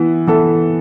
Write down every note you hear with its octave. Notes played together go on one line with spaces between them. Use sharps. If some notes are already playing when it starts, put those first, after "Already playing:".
Already playing: E3 B3 E4
E3 B3 E4 A4